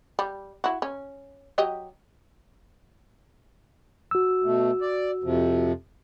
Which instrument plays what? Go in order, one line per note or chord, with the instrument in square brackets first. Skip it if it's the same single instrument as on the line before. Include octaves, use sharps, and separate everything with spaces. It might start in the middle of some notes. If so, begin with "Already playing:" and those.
[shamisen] G3
E4 F#4
C#4
F#3 G4 D#5
[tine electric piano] F#4 E6
[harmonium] B2 A3
D5
F2 C3 F3